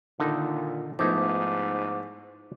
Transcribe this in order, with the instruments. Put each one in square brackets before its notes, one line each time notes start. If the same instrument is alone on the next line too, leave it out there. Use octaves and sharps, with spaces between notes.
[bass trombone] A#2 [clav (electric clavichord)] D3 D#4 [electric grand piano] D#3 A4
[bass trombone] G#2 [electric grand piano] F3 A3 B3 [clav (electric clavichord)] D#4 E4 C5 [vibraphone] D6